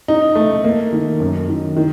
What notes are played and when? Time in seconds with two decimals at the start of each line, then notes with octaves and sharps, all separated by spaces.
0.08 D#4
0.35 A3
0.64 A#3
0.92 D#3
1.20 F#2
1.48 D#3
1.77 D#3